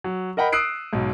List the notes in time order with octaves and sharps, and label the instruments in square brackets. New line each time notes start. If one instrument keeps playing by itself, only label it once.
[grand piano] F#3
A#4 D#5 F#5 G5 B5
D#6 E6 F#6 C7 D7
B1 G#2